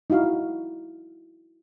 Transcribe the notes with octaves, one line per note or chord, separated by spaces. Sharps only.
D#4 E4 F#4 F5